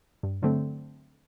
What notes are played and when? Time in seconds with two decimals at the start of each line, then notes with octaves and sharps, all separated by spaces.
0.23 G2
0.42 D3 F#3 A3 C4